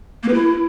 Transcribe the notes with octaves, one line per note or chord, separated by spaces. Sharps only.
A#3
B4
E4